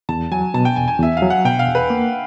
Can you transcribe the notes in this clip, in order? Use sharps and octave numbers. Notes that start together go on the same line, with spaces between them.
E2 A5
F#3 G#5
B2 A5
G5
E2 G#5
G#5
E2 E5
F5
F#3
F#5
B2 G5
F5
E2
B4
A#3